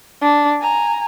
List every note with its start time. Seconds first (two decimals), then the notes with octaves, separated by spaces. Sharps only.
0.21 D4
0.60 G#5 A#5